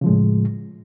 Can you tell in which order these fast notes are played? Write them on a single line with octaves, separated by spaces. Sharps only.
C#3 F3 G#3 A2